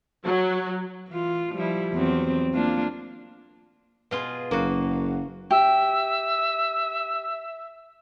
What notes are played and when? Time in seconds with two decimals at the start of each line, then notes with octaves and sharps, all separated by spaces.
0.24 F#3
1.08 E3 F4
1.53 F3 G3 E4
1.93 E2 F#3 C4
2.54 A#3 D4 F4
4.11 B2 F4 G#4
4.51 F#1 A#3 F#4
5.51 G4 E5